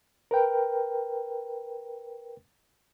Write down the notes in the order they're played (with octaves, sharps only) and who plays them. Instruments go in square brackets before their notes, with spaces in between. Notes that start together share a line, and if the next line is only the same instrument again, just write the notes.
[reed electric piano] A#4 B4 G5